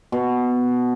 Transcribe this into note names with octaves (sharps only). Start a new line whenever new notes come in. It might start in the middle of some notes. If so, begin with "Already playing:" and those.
B2